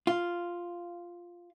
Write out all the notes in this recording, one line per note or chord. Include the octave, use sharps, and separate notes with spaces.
F4